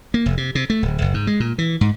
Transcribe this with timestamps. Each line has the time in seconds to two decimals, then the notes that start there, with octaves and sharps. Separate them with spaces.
0.14 A#3
0.26 F1
0.37 C3
0.55 C3
0.70 A3
0.82 D1
1.02 F#1
1.14 G#2
1.27 G#3
1.40 A#2
1.58 E3
1.81 G#2